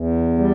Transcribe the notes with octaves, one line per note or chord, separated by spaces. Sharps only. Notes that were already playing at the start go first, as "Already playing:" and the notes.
Already playing: E2
G3